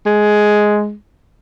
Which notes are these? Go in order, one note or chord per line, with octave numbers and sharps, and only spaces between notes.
G#3